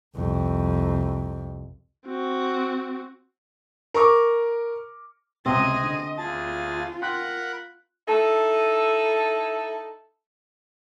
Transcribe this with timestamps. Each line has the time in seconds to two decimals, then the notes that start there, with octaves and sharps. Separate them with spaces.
0.16 C2 F2
2.06 C4 F#4
3.94 A#4 A#5 C#6 D6
5.46 C#2 C3 C4 G#4 D#5
5.83 D3
6.18 D2 F4 G#4 A5 A6
7.01 A#4 F#5 G5 B5 C6 F#6
8.07 D#4 E4 A4